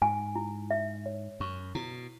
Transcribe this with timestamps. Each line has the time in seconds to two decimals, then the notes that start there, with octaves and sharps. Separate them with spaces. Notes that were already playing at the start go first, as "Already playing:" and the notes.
0.01 G#2 G#5
0.35 E4
0.71 E5
1.06 C#5
1.40 F#2 C#6
1.75 B2 E4